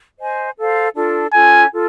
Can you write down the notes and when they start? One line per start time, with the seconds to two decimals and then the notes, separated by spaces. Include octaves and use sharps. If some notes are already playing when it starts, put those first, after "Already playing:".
0.19 C5 D#5 G#5
0.57 A4 C5 F5
0.95 D4 F4 A4
1.33 C#4 F4 A4 G#5
1.72 F4 A4